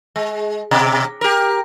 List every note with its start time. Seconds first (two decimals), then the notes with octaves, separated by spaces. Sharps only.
0.16 G#3
0.71 B2
1.21 G4 A#4